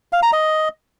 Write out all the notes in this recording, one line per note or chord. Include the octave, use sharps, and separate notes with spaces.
F5
A#5
D#5